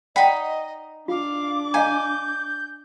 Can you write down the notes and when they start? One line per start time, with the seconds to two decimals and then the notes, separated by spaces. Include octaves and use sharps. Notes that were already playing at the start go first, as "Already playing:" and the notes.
0.16 D#4 D5 D#5 F#5 G5 B5
1.08 D4 F4 F5 D6
1.74 D#5 F5 G#5 A#5 G6